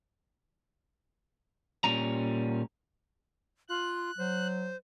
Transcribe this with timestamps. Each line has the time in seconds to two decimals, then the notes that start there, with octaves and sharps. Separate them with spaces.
1.84 A#2 G3 C#4 A#5
3.69 F4 F#6
4.18 F#3 C5